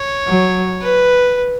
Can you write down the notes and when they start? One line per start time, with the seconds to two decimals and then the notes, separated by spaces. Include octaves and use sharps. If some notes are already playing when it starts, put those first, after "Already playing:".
Already playing: C#5
0.27 F#3
0.82 B4